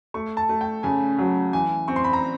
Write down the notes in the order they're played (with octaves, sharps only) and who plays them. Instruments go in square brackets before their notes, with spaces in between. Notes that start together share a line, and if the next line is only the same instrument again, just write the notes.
[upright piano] A3 C#6
A5
A3
G5
C#3 G#5
F#3
E3 G#5
C4 C#6
C6
B5
A#5